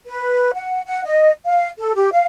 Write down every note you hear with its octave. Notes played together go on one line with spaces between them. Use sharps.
B4
F#5
F#5
D#5
F5
A4
G4
F5